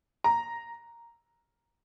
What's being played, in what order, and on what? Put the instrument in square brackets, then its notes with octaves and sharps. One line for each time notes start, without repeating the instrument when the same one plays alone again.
[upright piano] A#5